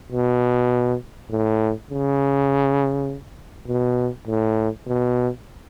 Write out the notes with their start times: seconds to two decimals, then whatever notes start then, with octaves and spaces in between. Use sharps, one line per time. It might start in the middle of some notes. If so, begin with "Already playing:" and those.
0.12 B2
1.30 A2
1.91 C#3
3.67 B2
4.27 A2
4.87 B2